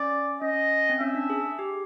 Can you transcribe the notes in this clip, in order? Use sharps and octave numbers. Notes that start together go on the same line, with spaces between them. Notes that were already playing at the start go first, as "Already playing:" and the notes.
Already playing: C#4 D5
C#4 D#5
C4
C#4 E5
D4
G#4
G4